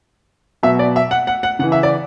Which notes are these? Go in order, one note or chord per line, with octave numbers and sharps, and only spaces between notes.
B2 F#3 E5
D5
E5
F#5
F#5
F#5
C#3 E3 F#5
E5
D5